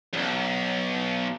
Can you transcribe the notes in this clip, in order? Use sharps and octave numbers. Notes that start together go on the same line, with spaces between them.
B1 F#2